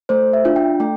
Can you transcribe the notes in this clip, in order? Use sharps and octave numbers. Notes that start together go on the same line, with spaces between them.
A3 C5
E5
D4 F4
G5
A3 G5